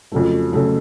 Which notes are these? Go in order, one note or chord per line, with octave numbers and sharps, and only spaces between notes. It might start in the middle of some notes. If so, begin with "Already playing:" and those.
F2 C#3 F#3 A3
C#3 F#3 A3